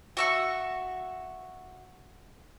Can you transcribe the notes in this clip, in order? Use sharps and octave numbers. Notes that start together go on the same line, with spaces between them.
F#4 E5 C#6